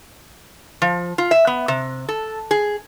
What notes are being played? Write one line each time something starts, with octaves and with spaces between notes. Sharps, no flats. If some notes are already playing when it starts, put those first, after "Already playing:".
F3
F4
E5
B3
C3
A4
G#4